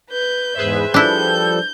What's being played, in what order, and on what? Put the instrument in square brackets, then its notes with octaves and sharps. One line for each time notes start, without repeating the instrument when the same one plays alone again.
[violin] B4 G6
[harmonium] E2 G#2 [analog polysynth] G#4 B4 C5 [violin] E5
[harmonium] F3 G3 A4 [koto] D4 E4 [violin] G6